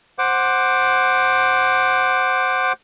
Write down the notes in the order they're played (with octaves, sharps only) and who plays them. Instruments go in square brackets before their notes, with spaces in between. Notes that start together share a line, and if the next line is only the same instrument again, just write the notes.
[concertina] C5 F#5 D6